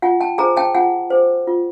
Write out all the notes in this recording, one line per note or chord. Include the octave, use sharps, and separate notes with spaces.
F4 F#5 G#5
G5 A5
G#4 C5 G#5 A#5
G5 A5
F4 F#5 G#5
G#4 C5
F4